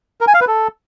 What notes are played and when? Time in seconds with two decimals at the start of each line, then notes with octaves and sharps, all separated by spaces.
0.21 A#4
0.27 G#5
0.34 F5
0.41 B4
0.47 A4